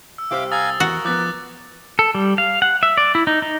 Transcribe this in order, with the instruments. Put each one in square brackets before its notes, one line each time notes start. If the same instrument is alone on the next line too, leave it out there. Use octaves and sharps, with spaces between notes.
[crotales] E6
[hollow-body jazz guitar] C2 G4 C5 [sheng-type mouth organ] E5 F5 D6
[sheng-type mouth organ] F5 G#5 A#5 [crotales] D#6 E6 A6
[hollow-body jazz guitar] E2 [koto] F#4 [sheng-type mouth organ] A#4
[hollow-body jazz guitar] F3 B3 [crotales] D6 F#6 A6
[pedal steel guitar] A4
G3
F5
F#5
E5
D5
E4
D#4
D#4